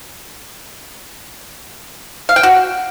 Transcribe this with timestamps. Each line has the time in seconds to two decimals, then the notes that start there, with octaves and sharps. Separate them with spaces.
2.29 F5
2.36 G5
2.43 F#4